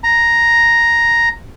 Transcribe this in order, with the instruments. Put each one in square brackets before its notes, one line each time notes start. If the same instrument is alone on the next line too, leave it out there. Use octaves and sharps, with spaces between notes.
[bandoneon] A#5